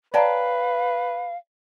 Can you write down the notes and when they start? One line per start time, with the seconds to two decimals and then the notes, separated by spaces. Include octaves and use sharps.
0.14 B4 C#5 D5 F5 G5 A5 A#5